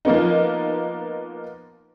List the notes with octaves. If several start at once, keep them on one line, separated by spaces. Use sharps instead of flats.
F3 A#3 B3 D#4